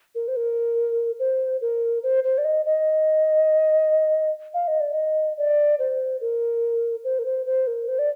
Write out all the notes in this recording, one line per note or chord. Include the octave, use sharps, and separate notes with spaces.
A#4
C5
A#4
C5
A#4
C5
C5
D5
D#5
D#5
F5
D#5
D5
D#5
D5
C5
A#4
C5
A#4
C5
C5
A#4
C5
D5